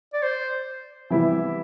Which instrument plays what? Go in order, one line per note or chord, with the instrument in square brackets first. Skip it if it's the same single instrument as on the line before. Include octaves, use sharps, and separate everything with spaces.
[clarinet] D5
C5
[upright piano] C3 E3 G3 B3 E4 [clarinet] E5